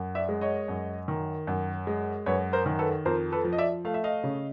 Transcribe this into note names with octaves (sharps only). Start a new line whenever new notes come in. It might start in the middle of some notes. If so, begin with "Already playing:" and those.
Already playing: F#2
D5 E5
G#3
C#5 D#5
F#2
D#3
F#2
G#3
F#2 B4 C#5
A#4 C5
D#3
A4 B4
F2 A#4 C5
A4 B4
F3
D#5
D5 E5
A3 F5
E5
D#5 F5
C#3